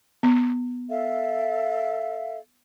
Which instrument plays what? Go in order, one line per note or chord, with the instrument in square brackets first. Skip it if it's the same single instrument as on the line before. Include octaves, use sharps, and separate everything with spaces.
[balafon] B3
[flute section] A4 E5 F5